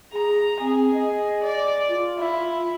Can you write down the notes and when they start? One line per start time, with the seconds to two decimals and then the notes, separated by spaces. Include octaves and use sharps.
0.13 G#4 A#5
0.60 C4 G#4
0.93 D#5
1.43 D5
1.88 F4
2.18 E4